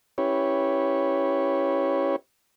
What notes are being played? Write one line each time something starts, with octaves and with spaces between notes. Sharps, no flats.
C#4 E4 G4 B4 C#5